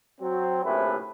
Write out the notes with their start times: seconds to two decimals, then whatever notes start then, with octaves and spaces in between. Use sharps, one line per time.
0.20 F#3 C4
0.64 A#1 A2 C3 C#4 E4 B4